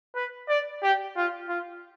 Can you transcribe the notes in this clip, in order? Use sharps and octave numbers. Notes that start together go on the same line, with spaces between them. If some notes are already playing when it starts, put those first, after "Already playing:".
B4
D5
G4
F4
F4